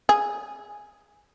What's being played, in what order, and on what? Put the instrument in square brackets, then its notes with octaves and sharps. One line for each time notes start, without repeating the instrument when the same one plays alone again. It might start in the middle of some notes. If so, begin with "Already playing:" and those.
[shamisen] G#4